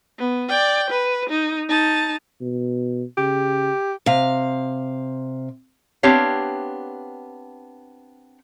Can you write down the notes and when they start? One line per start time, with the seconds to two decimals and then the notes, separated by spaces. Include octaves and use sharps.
0.18 B3
0.49 D5 G5
0.90 B4
1.29 D#4
1.69 D#4 A5
2.41 B2
3.18 C#3 G4
4.06 C3 F5
6.03 B3 C4 D4 G4 C#5 F5